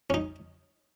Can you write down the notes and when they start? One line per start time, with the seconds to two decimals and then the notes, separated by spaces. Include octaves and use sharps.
0.10 C#4
0.14 D#4